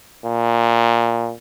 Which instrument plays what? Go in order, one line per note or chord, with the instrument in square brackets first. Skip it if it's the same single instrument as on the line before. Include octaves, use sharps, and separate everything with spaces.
[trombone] A#2